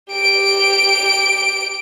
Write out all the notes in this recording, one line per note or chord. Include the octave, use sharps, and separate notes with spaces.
G4 D7